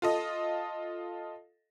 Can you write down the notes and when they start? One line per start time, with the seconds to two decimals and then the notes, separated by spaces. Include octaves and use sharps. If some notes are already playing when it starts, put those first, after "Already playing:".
0.02 F4 A4 D#5